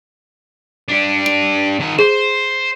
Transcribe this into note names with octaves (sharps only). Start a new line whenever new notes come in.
D4 G4
D7
D#3 A5
G#4 C5